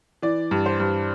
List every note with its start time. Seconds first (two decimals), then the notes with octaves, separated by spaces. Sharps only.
0.22 E3 D5
0.51 G2
0.66 C5
0.80 G2